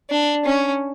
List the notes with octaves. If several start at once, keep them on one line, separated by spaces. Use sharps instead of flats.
D4
C#4